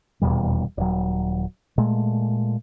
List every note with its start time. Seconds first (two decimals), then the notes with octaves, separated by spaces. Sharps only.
0.21 D#1 E2 B2 G3
0.77 D#1 F#3
1.78 A#2 G#3 A3